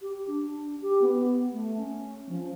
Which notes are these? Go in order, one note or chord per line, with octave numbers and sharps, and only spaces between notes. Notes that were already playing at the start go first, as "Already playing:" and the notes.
G4
D4
G4
B3
A3
C#4
F3